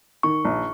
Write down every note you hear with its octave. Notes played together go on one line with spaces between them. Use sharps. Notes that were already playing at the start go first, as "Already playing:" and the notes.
D#3 C#6
A#1